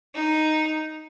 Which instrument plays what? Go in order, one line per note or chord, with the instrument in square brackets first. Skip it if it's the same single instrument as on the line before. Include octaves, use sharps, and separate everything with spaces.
[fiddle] D#4